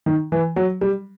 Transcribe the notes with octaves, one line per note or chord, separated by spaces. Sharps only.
D#3
E3
F#3
G3